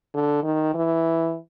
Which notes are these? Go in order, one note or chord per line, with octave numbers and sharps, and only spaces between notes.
D3
D#3
E3